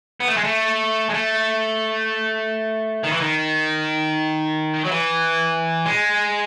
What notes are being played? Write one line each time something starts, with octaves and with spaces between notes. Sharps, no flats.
B3
A3
G#3
A3
G#3
A3
D#3
E3
D#3
F#3
E3
G#3